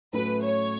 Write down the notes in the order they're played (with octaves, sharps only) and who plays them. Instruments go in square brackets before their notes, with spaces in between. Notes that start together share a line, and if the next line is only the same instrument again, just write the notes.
[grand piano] A2 F#3 A3 C#4 E4 [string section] B4
[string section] C#5